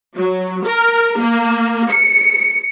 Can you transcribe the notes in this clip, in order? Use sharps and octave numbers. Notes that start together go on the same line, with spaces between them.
F#3
A#4
A#3
C#7